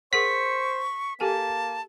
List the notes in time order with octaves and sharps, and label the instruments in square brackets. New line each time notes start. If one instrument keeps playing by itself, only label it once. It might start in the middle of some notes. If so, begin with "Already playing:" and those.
[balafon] G#4 A#4 F#5 [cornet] C5 [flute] C#6 [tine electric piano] B6
[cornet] A#3 [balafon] G4 A4 G#5 [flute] A5